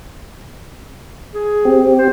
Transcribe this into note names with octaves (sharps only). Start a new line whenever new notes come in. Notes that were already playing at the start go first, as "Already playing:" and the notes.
G#4
C4 G4
C5